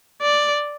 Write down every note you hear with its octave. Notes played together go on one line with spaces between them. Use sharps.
D5